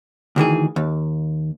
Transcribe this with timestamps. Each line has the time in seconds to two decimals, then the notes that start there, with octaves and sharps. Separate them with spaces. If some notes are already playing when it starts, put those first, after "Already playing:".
0.36 D2 D#3 E3 G#4
0.76 D#2